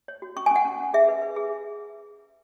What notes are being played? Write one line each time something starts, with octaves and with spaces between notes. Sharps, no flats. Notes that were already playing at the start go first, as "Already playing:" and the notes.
C#5
F#4
C#4 C#6
G#5
C#4
F#5
C#4
C#4
G#4 E5
B4
B4
G#4